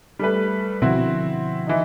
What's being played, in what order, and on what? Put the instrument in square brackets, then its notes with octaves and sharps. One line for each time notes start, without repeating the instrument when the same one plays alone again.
[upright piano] G3 A3 B4
[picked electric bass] B2 D3 F3 [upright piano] C4 E4 F#4
[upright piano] E3 D#4